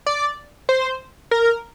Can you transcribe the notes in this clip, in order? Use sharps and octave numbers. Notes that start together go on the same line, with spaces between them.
D5
C5
A#4